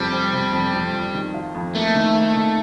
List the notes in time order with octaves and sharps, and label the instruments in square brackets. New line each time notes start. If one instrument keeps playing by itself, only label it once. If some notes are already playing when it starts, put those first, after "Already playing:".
Already playing: [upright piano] F2 C3 F3 [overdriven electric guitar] G3
[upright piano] C3
C3
F2
F2
F2
D#3
F4
F2
[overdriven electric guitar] A3 [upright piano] A#3
[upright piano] D#3
A#3
D#3